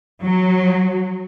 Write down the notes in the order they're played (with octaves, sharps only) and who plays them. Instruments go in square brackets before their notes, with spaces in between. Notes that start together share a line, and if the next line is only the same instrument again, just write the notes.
[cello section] F#3